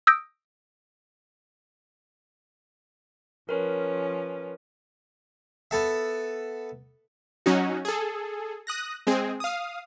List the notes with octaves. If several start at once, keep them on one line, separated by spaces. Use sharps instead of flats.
D#6 E6 G6 A#6 D7
F3 C#4 A#4 B4
B3 A4 E5
F#3 C#4 D#4 F#4
G#4 A4
D#6 F#6 A#6
G#3 C4 G#4
F5 D#6